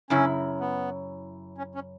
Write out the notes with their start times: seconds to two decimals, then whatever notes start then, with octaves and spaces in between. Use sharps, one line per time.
0.10 F#2 C#3 C#4 E4
0.60 B3
1.58 C#4
1.75 C#4